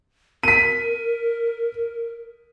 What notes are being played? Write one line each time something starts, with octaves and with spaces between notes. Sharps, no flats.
A#4 B6 D#7